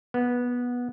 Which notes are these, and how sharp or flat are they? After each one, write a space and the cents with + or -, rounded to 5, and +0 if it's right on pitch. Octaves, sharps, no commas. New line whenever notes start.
B3 -15